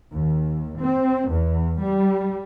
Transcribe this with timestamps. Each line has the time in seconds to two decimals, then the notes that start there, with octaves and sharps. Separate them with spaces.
0.11 D#2
0.78 C4
1.29 E2
1.81 G3